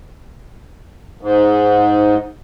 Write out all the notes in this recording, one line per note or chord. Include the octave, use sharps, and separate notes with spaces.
G#2